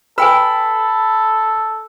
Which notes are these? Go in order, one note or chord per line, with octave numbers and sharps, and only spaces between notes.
A4 B4 G5 G#5 B5 E6